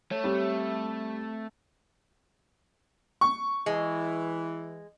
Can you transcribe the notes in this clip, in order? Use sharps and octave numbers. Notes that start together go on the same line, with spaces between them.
A3 C#5
G3 C4
C#6
E3 G#3